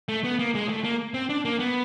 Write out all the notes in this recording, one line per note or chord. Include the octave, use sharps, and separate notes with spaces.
A3
B3
A#3
G#3
A3
A#3
C4
D4
A#3
B3